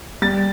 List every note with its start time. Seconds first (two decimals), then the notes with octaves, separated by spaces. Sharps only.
0.22 G3 A6